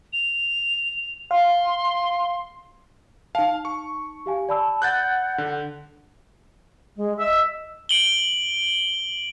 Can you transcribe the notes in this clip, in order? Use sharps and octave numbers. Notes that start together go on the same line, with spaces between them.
F7
F5 C6
D#4 F5 A5
C#6
G4 F5 G#5
D5 A5 B5 E6
F#5 F#6 G6 A6
D3
G#3
D#5 E5
D7 F#7 G7